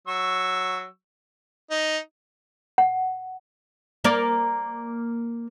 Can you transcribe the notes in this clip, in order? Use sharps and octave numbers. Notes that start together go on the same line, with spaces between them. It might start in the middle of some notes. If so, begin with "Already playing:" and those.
F#3 C#6 E6
D#4
F#5
A#3 A#4 D5